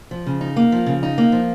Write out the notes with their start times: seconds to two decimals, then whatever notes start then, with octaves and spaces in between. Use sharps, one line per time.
0.11 F3
0.26 C#3
0.41 D#4
0.56 A#3
0.72 F3
0.86 C#3
1.03 D#4
1.18 A#3
1.32 F3